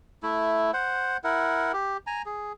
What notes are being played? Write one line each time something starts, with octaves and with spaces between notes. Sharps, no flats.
A3 E4
C5 F#5
E4 A#4 F#5
G4
G#5 A#5
G#4